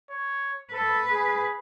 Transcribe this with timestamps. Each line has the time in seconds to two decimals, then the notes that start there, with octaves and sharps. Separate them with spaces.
0.11 C#5
0.73 A4 B4
1.11 G#4